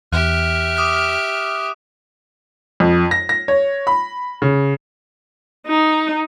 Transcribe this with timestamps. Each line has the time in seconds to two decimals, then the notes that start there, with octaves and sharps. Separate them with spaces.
0.13 E2 G4 E5 F6 F#6
0.77 D6 D#6 F#6
2.80 F2
3.11 A#6
3.29 A#6
3.48 C#5
3.87 B5
4.42 C#3
5.67 D#4